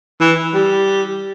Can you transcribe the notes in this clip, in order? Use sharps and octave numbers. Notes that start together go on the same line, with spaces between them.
E3
G3